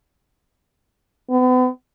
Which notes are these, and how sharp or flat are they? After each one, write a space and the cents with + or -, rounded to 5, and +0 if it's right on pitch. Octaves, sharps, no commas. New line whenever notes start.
B3 +40